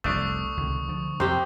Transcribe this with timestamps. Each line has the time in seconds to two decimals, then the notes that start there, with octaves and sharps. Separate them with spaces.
0.04 F1 C2 A3 D4 C#6 D#6
0.57 C#2 C3 D#3
0.89 D3 F3
1.20 F2 C3 G4 C5